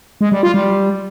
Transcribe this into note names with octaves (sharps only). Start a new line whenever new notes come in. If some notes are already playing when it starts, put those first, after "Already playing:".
G#3
G3
F4
G3